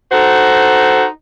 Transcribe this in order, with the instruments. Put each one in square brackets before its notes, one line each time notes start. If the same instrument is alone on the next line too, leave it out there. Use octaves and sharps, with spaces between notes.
[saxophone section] D#4 F#4 A4 C5